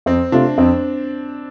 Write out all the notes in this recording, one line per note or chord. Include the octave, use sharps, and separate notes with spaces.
F2 C4
C3 A3 D4 F4
F2 C4